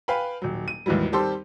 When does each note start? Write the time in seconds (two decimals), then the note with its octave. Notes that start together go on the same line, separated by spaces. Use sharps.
0.08 B4 F5 G5 G#5 B5
0.42 D#1 F#3
0.68 D#7
0.86 D#2 G#2 E3 F#3 G3
1.12 D#3 G3 C4 G4 A4 C5